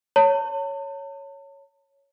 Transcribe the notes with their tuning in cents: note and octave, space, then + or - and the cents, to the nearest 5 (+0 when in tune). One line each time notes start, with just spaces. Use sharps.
C#5 +0 A5 +40